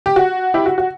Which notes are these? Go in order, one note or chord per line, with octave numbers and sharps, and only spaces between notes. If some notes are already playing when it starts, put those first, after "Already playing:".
G4
F#4
E4 G4
F#4
F#4